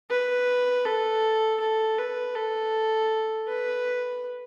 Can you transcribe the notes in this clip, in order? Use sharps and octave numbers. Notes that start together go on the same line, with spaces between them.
B4
A4
A4
B4
A4
B4